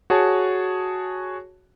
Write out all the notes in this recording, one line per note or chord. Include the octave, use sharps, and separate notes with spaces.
F#4 G#4 C#5 A5